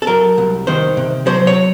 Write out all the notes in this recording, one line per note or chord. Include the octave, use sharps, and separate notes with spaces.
A4
F#3 A#4
C2
D#3 C5
C3
F#3 C5
C#5